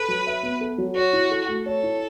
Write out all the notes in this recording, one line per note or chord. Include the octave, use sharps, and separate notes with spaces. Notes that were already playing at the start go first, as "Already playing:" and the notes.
Already playing: A4 B4
F#3
E5
B3
A4
F#3
F#4 C#5
E4
A4
A3
A4 C#5
E4